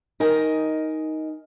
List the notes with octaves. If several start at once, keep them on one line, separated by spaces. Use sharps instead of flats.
D#4 A#4 D#5 G#5